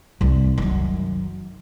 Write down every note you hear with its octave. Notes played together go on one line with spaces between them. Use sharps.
C2 G3
F#2 D#3